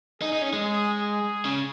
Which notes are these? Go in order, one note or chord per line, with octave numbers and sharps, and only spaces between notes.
D#4 G#4
D#4
C#4
G#3
G#4
G#4
C#3